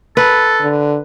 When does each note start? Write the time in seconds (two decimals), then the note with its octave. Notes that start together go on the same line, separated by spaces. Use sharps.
0.17 A4 B4
0.62 D3